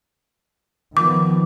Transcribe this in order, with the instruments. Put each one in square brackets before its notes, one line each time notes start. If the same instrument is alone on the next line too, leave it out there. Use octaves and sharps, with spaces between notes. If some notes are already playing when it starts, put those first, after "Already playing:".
[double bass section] D#3 F3 B3 [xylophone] D6